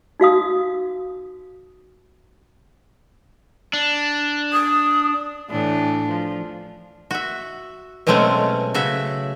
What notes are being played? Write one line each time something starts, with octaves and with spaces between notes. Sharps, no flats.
D#4 F#4 F5 D#6
D4
D#6
A2 E3 D4
F3
F#4 E5
B2 F#3 G#3 A3 C4 C#4
C#3 F#4 E5